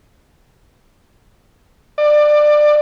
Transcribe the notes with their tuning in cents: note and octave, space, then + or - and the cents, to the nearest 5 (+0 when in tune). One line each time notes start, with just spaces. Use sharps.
D5 +20